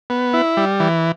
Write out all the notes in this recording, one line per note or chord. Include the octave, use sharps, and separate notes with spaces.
B3
E4
G3
E3